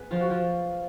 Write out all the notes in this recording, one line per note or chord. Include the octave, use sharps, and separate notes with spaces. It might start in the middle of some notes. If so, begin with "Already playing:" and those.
Already playing: B3 G#4 B4
F3 F4
F#4
F3 F4